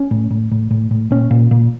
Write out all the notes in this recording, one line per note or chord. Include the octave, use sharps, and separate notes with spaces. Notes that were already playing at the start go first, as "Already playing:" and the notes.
Already playing: C#4
A2
A2
A2
A2
A2
A#2 C#4
A#2
A#2